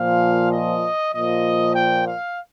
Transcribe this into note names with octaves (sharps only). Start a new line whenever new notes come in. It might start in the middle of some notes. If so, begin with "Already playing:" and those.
Already playing: A#2 F3 F5
D#5
A#2 F3 D#5
G5
F5